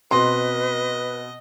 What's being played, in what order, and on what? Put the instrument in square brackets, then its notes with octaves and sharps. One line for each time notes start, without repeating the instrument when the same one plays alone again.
[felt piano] B2 C4 [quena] B4 [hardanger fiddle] D#5 [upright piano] C6